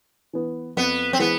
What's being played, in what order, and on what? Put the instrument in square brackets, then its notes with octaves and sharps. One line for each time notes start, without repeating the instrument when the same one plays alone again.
[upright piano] E3 B3
[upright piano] F2 [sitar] B3
[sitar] C4
[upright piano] E3 G#3 [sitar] B3